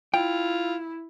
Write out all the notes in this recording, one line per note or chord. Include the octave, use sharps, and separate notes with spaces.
E4 F4 G5